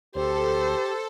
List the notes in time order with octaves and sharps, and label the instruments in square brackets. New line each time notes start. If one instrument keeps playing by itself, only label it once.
[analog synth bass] D2 [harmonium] G4 [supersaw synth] A4 [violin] C5